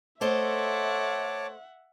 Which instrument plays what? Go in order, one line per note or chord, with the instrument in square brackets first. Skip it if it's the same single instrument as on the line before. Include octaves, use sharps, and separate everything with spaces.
[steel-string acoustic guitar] A3 C5 D#5 [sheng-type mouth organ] C#5 A5 D6 [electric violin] E5 F#5